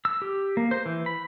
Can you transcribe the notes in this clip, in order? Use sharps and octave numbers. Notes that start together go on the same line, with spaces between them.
E6
G4
A#3
C5
E3
B5